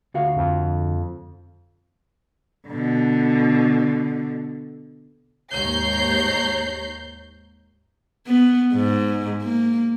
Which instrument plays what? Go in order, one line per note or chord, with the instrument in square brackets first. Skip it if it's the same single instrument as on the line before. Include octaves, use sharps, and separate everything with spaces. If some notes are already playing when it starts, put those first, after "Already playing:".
[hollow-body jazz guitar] D2 F#4 F5
[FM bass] F2
[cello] B2 D3
[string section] D#2 G#2 C#5 A#5 G6 C7
[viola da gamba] B3
G#2
A#3